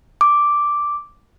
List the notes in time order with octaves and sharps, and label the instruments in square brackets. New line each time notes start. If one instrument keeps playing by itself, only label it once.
[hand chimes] D6